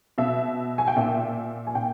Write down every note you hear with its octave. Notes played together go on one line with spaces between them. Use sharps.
B2 E5
G#5
G5
A#2 E5
G#5
A#2 G5